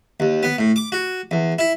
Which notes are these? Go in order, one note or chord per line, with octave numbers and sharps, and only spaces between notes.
D#2
B3
A2
D6
F#4
E2
E4